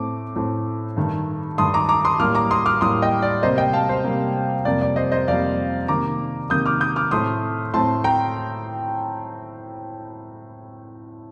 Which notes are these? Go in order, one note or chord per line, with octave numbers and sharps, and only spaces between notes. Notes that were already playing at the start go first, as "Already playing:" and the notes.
Already playing: A2 A3 C4 D6
A2 A3 C4
G2 D#3 A3
G2 D#3 A3 C6 D#6
A#5 D6
A#5 D6
C6 D#6
A2 G3 A#3 D6 F6
A#5 D6
C6 D#6
D6 F6
A2 G3 A#3 C6 D#6
D#5 G5
D5
C3 G3 A#3 C5 D#5
D#5 G5
F5 A5
C5
C3 G3 A#3
F2 C3 G3 A#3 D5
D5
C5 D#5
C5 D#5
F2 C3 G3 A#3 D5 F5
C3 D#3 A#3 A#5 D6
C3 D#3 A#3 D#6 G6
D6 F6
D#6 G6
D6 F6
A2 A3 C4 C6 D#6
A2 A3 C4 A5 C6
G5 A#5